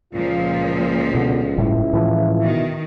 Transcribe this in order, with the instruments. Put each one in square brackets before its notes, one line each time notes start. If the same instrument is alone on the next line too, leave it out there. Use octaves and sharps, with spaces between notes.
[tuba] C#2 [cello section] A#2 F3 [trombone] F4
[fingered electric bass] B2 [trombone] D3
[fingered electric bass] G1 A2 G3 [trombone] E4
[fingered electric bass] A2 E3 F3
[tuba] B2 [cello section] D#3